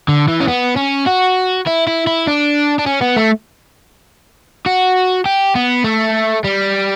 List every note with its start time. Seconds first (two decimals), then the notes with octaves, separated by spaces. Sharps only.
0.08 D3
0.28 E3
0.41 C#4
0.48 B3
0.77 C#4
1.07 F#4
1.67 E4
1.87 E4
2.07 E4
2.27 D4
2.79 D4
2.86 C#4
3.01 B3
3.16 A3
4.66 F#4
5.25 G4
5.55 B3
5.84 A3
6.44 G3